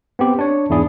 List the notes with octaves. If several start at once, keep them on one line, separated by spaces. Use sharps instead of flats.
B3 C4 G4
D4 C#5
E2 G#2 D4 E4 G#4 D5